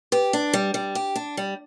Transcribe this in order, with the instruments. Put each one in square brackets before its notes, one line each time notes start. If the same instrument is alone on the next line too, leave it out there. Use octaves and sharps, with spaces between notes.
[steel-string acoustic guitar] G4 [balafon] B4
[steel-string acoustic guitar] D4
G3
G3
G4
D4
G3